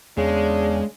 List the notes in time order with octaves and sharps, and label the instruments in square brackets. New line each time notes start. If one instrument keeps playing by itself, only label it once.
[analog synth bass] E2 [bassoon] C#3 [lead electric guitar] G#3 [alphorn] D4